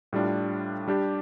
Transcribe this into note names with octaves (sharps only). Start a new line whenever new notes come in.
A2 G3 D4 F4
G3 D4 G4